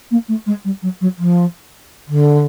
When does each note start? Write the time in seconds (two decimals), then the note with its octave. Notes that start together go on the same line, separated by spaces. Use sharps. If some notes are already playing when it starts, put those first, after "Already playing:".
0.11 A#3
0.28 A3
0.46 G#3
0.64 G3
0.82 F#3
1.01 F#3
1.18 F3
2.08 D3